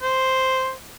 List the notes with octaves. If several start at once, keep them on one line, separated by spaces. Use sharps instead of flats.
C5